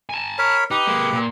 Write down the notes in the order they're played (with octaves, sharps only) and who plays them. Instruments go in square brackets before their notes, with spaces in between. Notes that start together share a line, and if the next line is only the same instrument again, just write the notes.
[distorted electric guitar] G#5 A5
[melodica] A#4 C#5 B5
[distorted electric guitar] D#4 [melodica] G4 B4
[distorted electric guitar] G#3 A#3
A#2